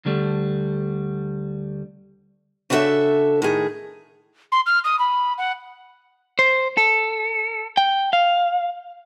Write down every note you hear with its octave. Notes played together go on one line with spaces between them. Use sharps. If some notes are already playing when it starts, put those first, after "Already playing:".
D2 D3 G3 A3
C#3 D4 E4 F#4 A4 E5
A2 D#3 G#4
C6
F6
D#6
B5
F#5
C5
A4
G5
F5